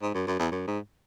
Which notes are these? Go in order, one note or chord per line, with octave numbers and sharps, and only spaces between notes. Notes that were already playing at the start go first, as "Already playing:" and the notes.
G#2
F#2
F#2
E2
F#2
G#2